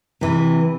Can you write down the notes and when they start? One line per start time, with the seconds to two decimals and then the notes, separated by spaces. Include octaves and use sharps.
0.21 C3 E3